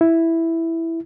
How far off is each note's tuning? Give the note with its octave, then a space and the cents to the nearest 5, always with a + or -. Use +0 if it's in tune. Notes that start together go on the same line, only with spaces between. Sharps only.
E4 +0